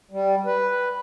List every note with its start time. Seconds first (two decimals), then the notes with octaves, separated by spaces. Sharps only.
0.11 G3
0.46 B4